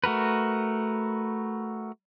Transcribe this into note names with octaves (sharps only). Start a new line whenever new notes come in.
A3 F#4 A#4 B4